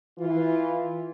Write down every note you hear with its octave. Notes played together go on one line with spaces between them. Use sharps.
E3 F4